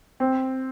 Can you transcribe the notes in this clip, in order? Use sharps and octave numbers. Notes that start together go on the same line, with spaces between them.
C4